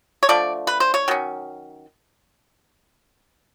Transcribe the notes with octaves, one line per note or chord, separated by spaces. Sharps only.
C#5
D3 F3 A3 D5
B4
C5
C#5
D#3 F#3 C#4